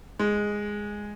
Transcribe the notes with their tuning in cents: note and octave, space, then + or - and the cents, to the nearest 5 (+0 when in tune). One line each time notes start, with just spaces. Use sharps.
G#3 -5